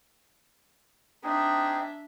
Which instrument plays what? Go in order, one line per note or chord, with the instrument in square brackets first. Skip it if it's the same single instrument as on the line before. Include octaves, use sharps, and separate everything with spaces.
[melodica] C4 D#4 G#4 [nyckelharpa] D4 E5